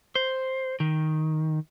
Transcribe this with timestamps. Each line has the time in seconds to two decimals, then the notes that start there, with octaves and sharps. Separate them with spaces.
0.15 C5
0.80 D#3